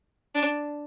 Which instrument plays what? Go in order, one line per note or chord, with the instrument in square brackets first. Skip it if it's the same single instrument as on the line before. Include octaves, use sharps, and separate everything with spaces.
[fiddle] D4